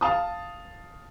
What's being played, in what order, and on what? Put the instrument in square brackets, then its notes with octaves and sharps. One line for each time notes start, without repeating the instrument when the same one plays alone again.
[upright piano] F5 A5 D#6